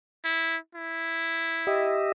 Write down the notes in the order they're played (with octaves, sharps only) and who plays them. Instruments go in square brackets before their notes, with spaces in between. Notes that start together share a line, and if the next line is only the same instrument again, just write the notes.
[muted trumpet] E4
E4
[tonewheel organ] G4 D#5 E5